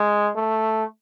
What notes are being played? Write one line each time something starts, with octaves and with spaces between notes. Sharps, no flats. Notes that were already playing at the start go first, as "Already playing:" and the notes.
Already playing: G#3
A3